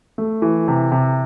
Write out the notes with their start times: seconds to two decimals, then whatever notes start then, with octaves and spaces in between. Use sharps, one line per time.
0.18 A3
0.42 E3
0.68 C3
0.92 C3